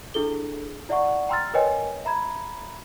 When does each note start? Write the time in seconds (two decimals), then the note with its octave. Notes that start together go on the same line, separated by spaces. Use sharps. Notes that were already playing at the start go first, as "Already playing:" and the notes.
0.14 D4 E4 G#4 A4 G7
0.89 E4 D5 E5 F#5 C#6
1.29 G5 A#5 C6 E6 F6 A6
1.54 A#4 B4 C#5 D#5 G5 G#5
2.05 E5 A#5 B5 G#6